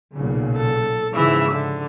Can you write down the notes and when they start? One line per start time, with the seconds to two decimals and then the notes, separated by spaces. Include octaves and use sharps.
0.15 B1 A#2 C#3
0.57 A4
1.15 G#2 C#3 E3 F3 E5
1.52 D3